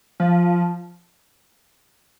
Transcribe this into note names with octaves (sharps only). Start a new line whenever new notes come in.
F3